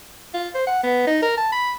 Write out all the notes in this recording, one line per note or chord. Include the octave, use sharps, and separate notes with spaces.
F4
C5
F#5
B3
D#4
A#4
A5
B5